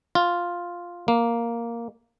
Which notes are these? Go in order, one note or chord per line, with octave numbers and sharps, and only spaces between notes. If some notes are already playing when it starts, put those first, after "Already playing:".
F4
A#3